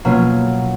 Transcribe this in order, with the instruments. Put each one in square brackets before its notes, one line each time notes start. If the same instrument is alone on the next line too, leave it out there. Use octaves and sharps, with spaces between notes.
[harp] B2 F#3 A#3 C#4 F4